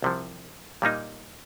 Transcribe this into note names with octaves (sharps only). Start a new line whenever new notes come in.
C2 C3 F3
A#2 G3 A#3 D#4